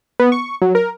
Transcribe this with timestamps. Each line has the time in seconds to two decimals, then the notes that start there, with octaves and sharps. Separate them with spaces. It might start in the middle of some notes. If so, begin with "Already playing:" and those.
0.20 B3
0.32 C#6
0.62 F#3
0.75 A#4